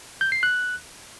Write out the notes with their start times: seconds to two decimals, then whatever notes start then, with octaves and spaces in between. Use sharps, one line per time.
0.21 G6
0.32 C7
0.43 F#6